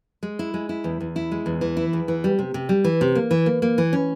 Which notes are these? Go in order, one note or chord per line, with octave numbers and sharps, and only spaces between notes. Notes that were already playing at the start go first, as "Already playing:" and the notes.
G#3
E4
G#3
E4
E2
E2
E4
G#3
E2
E3
E4
E2
E3
G3
C3
C3
G3
E3
C3
A#3
E3
A#3
A#3
E3
C#4